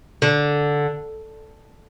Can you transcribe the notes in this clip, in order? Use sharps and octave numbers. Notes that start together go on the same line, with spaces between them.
D3